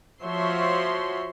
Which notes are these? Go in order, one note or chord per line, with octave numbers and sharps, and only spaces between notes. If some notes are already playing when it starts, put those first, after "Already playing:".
F3 F#4 C#5 E5 C6